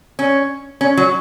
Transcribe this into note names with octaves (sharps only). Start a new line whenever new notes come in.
C#4
C#4
F#3